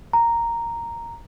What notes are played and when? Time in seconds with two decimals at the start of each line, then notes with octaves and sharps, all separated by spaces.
0.13 A#5